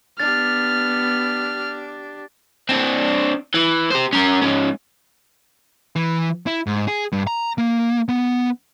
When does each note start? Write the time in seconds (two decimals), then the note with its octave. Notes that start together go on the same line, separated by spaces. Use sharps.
0.20 B3 D4 G4 F6 A6
2.69 C4 D4
3.54 E3
3.90 G4 C5
4.13 C#4 A#4
4.42 G#2 C#4
5.96 E3
6.46 E4
6.67 G#2
6.88 G#4
7.12 G2
7.27 A#5
7.58 A#3
8.09 B3